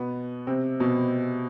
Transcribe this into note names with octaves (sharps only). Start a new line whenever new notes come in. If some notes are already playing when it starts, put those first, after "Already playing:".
Already playing: B2 B3
C3 C4
B2 B3